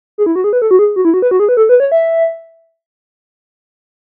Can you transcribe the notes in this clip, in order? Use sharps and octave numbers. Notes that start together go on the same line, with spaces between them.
G#4
E4
F#4
G#4
B4
A4
F#4
G#4
F#4
E4
F#4
B4
F#4
G#4
B4
A4
B4
C#5
E5